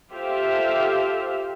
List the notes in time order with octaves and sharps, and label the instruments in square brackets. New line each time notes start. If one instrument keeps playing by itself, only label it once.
[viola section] F4 G4 A4 C5 E5 F5